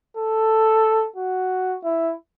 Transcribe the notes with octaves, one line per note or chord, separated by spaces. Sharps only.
A4
F#4
E4